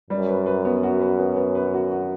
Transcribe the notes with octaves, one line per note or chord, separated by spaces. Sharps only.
F#2 G3
B4
B4
B3
F#4
B4
B3
B3
B4
F#4
F#4